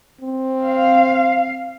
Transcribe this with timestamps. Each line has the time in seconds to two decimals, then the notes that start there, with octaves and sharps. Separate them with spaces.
0.21 C4
0.63 F5